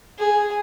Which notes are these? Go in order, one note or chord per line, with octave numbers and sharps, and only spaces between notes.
G#4